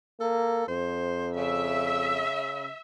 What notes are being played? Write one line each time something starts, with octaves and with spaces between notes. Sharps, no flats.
A#3 A4
F2 C5
C#3 E5